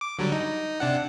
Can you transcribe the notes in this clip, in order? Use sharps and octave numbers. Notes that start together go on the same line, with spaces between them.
D6
D3 F#3 G3
D#4
C3 D4 F#5